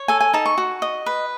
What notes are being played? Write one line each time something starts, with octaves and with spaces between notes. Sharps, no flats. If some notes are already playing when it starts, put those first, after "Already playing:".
Already playing: C#5
A4 G#5
G#5
D#4 A5
C#6
F#4
D#5
B4